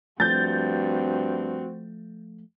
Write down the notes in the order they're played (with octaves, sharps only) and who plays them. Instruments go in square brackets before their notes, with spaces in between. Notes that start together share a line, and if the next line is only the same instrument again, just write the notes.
[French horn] G2 [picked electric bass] F3 A3 [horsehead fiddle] C4 F#4 [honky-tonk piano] G6 A6